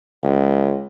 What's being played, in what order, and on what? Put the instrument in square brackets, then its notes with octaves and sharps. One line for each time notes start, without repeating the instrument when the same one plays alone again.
[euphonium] C#2